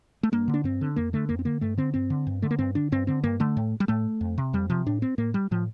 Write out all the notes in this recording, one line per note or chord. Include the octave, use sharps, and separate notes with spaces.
A3
G2 A#3
D3
D4
G2 C4
D3
F2 A#3
D3 A3
F2 A#3
C4
D3 A#3
G2 A3
D3 C4
G2 C4
D3
G2
D3 A3
A#3
G2 C4
D3 D4
G2 C4
D3 C4
G2 A#3
D3 A3
A2
G3
A2 A3
F2
C3
F2 G3
C3 F3
A2 D4
C4
A2 A#3
G3
A2 F3